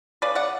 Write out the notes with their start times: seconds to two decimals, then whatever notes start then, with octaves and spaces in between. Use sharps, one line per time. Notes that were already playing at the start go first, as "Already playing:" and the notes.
0.22 C#3 B4 D5
0.35 D5 F#5